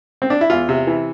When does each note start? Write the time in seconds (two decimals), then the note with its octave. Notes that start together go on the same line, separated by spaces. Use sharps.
0.22 C4
0.30 D4
0.41 E4
0.50 E2 F4
0.69 C3
0.87 E3